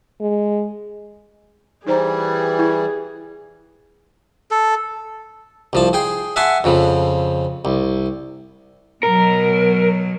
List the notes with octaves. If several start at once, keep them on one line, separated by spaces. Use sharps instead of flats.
G#3
E3 G3 D#4 G#4 C5 A#5
E4
A4
C2 F3 A5
G#4 G5 C6
E5 F#5 G#5 A5 C6 C#6
F2 C#3 F3
C2
B2 F#3 A#4